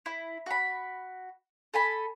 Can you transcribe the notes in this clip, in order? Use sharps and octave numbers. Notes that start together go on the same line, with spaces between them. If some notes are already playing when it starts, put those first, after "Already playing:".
E4
F#4 B5
A4 G#5 B5